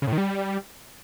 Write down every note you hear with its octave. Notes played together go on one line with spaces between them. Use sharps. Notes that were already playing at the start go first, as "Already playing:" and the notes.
C#3
A2
D#3
G3